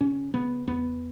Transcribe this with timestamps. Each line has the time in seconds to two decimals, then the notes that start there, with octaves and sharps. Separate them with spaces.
0.01 C#3 C#4
0.34 C#3 B3
0.67 E2 B3